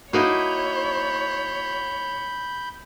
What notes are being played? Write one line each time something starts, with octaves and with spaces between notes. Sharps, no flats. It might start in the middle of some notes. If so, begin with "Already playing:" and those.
A#3 D#4 E4 F#4 C#5 B5 G6